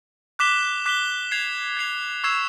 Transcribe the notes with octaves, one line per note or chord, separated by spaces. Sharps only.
D6 F#6 B6 E7 G7
D6 F#6 B6 E7 G7
G#6 C7 F7
G#6 C7 F7
C#6 E6 G#6 C7 E7